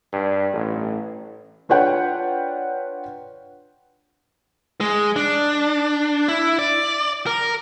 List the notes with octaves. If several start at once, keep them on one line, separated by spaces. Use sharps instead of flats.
G2
A1
D4 F4 B4 C#5 F#5 G5
G#3
D4
E4
D5
A#4